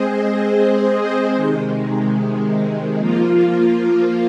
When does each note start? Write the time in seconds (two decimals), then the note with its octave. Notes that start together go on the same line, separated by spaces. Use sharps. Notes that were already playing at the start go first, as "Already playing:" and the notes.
Already playing: G#3 C4 G#4 C5 D#5
1.33 C3 D#3 G#3
2.97 F3 A#3 F4